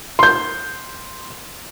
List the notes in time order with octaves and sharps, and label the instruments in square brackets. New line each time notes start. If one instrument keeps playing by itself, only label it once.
[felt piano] C6 G6